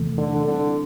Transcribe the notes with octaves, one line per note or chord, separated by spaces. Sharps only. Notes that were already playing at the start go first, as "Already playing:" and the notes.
Already playing: E2 C3 E3 A3
D3
D3 G3 C4 E4